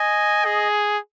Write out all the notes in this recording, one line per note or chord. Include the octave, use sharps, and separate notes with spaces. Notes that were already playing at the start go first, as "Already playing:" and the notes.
Already playing: D#5 G#5
G#4